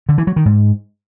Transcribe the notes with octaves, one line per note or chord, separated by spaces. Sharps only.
D3
E3
F#3
D#3
G#2